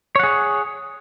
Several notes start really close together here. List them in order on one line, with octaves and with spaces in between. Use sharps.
C#5 F#5 G#4